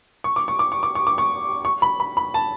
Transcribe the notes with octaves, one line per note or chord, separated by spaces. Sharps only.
C#6
D6
C#6
D6
C#6
D6
C#6
D6
C#6
C#6
B5
B5
B5
A5